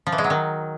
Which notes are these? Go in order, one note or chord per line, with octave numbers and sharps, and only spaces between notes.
F3
E3
G#3
F#3
D#3